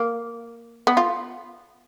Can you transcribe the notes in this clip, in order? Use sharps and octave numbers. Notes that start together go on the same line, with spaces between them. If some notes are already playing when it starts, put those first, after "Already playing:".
Already playing: A#3
B3
F4